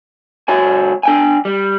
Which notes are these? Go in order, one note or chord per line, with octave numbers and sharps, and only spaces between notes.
C#2 F#4 C#5 G#5
D4 G5 G#5
G3